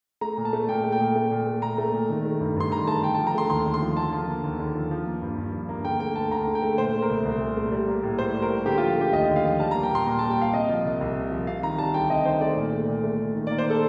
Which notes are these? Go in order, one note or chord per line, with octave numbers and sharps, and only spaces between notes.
A3 A#5
A#2
A5
A3
A#2 G5
A3
G5
A#2
A3
A#2
A3
A#2 A#5
A3
A#2
D#3
A3
G2
G2 C6
D#3 A#5
A3 A5
D3 G5
A5
F3
A#5
A3 C6
D#2 C6
D3
C6
F3
D3 A5
F3
A#3
D#2
D3
F3
F3
A#3
G2
G2
F3
A#3
D3 G5
A3 G5
D2 A5
D2 A#5
D3
G5
A3
A#2 C5
A3
A#4
C2
C2
A#2
A3
G3
A#3
A2
A2 C5
G3
A#4
A#3
D3 G4
F4
F3
A3 G4
D#2 D#5
D3
F5
F3
G3 A5
A#5
A#3
G5
A#2 C6
A#2 A#5
A5
G3
G5
A#3 F5
C3 D#5
F3
C2
C2
C3
F3
C3 F5
D#3 A#5
G3 A5
D2 G5
C3 D#5
D#3 C5
A3 D5
A#2
A3
A#2
A3
A#2
D#3
D5
A#3
C5
A4